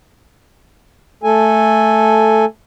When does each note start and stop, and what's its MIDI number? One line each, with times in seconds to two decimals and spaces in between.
1.24 2.45 57
1.24 2.45 69
1.24 2.45 80